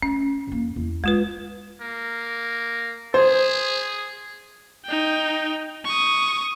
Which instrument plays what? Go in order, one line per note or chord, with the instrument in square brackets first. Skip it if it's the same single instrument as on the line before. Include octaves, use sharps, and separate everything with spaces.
[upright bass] A3 [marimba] C#4
[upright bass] F2 A#3
E2
[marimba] G#3 F4 B4 [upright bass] D4
[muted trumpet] A#3
[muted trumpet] G#4 [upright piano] C5
[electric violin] D#4 G5
C#6 D#6